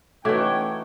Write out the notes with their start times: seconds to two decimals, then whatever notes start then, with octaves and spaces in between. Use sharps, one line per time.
0.25 E3 A3 C#4 D#4 F#4 G5 D6 G#6